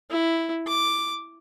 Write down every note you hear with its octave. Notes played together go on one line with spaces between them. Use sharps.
E4
D6